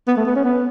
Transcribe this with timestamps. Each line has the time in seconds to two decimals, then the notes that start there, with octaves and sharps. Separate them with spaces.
0.08 B3
0.17 A3
0.27 B3
0.36 C#4
0.44 B3